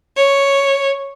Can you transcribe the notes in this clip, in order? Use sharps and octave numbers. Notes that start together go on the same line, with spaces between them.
C#5